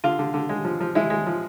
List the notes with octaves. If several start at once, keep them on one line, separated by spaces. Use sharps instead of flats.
D3 F4
D3
D3
G#3
F3
F3
G#3 E4
G#3
F3